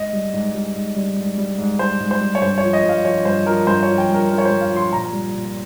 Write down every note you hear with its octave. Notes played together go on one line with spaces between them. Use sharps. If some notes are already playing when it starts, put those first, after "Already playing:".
Already playing: G#2 D#5
G3
G#2
G3
G#2
G3
G#2
G3
G#2
G3 C5
G#2
C5
G3
C#5
G2 C5
C#5
F3
D#5
G2
F5
F3 C#5
G2 C5
F3 A#4
G2 C5
F3 C#5
G5
G2
A#4
F3 A#4
C#5
C5
G2
F5
F3 C6
A#2 A#5
G3
A#2